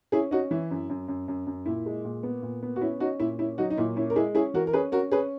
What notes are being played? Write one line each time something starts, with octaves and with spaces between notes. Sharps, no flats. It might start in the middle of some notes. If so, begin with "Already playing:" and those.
C#4 E4 G#4
C#4 D#4 F#4
E3 E4
F#2
F#2
F#2
F#2
F#2
A#2 E4
G#3
A#2
B3
A#2
B3
F#4
C#4 E4
C#4 D#4 F#4
A#2 E4
C#4 E4
F#3 D#4 F#4
D#4
A#2 E4
C#4 E4
A#4
G#3 E4 G#4
C#4 E4 G#4
E3 F#4 A#4
A#4
C#4 G#4 B4
C#4 F#4 A#4
C#4 G#4 B4